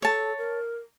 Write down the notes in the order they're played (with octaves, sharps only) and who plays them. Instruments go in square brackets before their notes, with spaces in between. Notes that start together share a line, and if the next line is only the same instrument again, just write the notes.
[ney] A4 [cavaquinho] C#5 A5
[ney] A#4